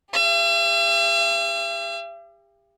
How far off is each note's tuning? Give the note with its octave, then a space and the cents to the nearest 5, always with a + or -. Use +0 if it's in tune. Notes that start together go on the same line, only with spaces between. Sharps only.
G4 +35 E5 +45